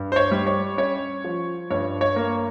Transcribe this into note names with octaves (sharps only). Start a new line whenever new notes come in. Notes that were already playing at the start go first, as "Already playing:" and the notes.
Already playing: G2
C5
C#5
G3
C#5
C#4 C#5
F3
G2 C#5
C#5
A#3